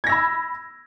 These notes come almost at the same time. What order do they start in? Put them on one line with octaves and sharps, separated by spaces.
G#6 A#6 E6 B5